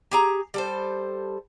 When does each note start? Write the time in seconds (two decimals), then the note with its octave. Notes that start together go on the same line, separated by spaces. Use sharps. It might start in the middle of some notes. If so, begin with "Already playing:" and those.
0.11 G4 G#4 A#5
0.54 G3 A4 C5